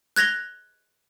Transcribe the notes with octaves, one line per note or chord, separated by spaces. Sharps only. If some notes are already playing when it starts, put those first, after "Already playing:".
F#6 G#6 A#6 F7 G7